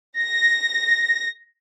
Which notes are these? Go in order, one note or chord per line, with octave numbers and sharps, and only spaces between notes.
A#6